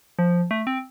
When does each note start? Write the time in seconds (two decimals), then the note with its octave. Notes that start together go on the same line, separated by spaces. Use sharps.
0.19 F3
0.51 A3
0.67 C4